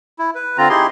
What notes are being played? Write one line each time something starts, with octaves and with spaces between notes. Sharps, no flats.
E4
B4
D3 C4 F4 A#5
D#4 E4 G4 G#4 C6